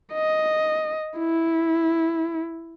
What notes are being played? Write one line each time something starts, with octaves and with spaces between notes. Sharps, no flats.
D#5
E4